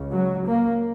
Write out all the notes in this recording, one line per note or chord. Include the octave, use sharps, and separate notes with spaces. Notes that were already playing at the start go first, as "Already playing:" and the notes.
Already playing: C#2 C#3
F#3
A#3